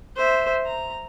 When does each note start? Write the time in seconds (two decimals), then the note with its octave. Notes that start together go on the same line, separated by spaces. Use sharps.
0.16 C5 E5
0.66 A#5